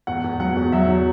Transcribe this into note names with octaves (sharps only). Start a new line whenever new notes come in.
E2 F#5
E2
F#3 F#5
E2
F#3 E5
F#3